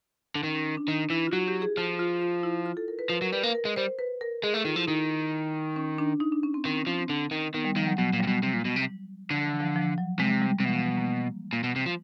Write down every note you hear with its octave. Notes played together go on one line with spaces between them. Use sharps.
D3
D#3 C#4
C#4
C#4
D4
D#3 D#4
E3 E4
F4
F#3 F#4
G4
G#4
F3 F4
F4
F4
E4
F4
A4
A#4
B4
F3 B4
F#3 A#4
G3 B4
A#3 A#4
A#4
G#3
G3 C5
B4
A#4
G#3 G#4
A3 A4
D#3 F4
F3 E4
D#3 D#4
C#4
D4
D#4
D4
C#4
C4
D#3 C4
C#4
F3 C#4
C4
D3
D#3
D#3 B3
G3
D#3 F3
F#3
B2 F#3
A#2
G3
A#2
B2
C3
A#2
B2
C3
D3 F3
E3
F3
F3
F#3
C3 G#3
G3
C3
B2 E3
F3
G3
A#3
A#2
B2
C3
F3